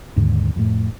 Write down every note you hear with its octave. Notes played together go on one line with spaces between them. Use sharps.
D#2 G#2 D3
F2 A2